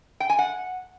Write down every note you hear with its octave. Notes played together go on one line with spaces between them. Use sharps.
G5
G#5
F#5